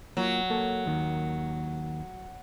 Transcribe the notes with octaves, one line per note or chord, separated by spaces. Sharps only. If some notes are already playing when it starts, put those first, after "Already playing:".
F#3 A#3 F4
A#3 A4 C#5
D#2 D#3 A#3